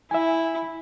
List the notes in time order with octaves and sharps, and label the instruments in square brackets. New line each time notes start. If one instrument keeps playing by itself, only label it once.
[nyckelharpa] E4 [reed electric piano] E5 G#5